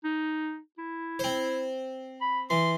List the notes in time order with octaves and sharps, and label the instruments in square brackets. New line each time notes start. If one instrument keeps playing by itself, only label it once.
[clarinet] D#4
E4
[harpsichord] C4 C5
[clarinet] B5
[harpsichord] E3 [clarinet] C6